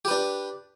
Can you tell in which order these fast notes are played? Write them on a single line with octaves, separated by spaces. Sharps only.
G4 B4 D4